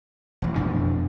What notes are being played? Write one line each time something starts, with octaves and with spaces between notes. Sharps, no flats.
E1 A1
F2 B2 D4